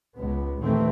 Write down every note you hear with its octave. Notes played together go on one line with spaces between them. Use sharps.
C#2 G#3 B3
A#1 D#2 C#3 E3 A3 C4